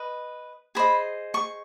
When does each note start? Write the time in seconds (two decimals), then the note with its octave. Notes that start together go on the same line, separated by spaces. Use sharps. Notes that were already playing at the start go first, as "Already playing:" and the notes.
Already playing: B4 D#5
0.75 G#4 C5 D#5 B5
1.34 C#6